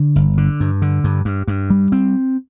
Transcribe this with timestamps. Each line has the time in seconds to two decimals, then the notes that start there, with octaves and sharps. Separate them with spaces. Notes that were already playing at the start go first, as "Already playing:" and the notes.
Already playing: D3
0.16 G1
0.38 D3
0.60 G2
0.82 D3
1.04 G2
1.25 G2
1.48 G2
1.70 G3
1.92 C4